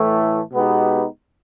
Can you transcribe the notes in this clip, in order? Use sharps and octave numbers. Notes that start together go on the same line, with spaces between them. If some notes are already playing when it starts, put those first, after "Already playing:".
Already playing: A2 E3 A3
B2 G#3 B3 D#4 G4